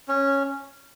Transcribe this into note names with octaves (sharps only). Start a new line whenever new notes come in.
C#4